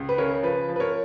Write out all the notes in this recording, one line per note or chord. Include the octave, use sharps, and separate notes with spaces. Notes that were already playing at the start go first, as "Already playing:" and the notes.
Already playing: C#2
B4
C#3 A#4 C#5
F3 B4
F3
B4
A#4 C#5